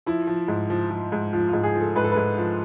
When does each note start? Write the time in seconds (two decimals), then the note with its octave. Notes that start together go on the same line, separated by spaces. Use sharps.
0.06 F3 E4
0.27 F3
0.48 G#2
0.70 F3
0.90 F3
1.12 G#2
1.33 F3 F4
1.48 G#2 F4
1.64 G#4
1.75 F3
1.80 A4
1.95 G#2 B4
2.04 A4
2.12 G#2 B4
2.38 F3